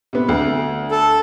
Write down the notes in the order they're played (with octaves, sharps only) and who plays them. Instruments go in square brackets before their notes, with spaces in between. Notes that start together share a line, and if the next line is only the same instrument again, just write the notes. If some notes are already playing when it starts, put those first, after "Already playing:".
[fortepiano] C3 B3
D2
[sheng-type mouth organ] A4